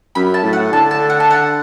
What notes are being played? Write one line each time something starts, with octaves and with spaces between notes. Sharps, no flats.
F#2 B5
A5
A2
F#5
D3 A5
A5
F#5
A5
F#5